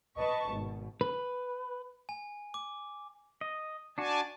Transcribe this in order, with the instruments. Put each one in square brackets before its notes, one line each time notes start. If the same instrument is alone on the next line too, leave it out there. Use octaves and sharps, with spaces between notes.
[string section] B4 D#5 A5 C#6
G#1 B2
[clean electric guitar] B4
[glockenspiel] G#5
D6
[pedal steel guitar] D#5
[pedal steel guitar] D4 F#4 [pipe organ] D5 G#5 A5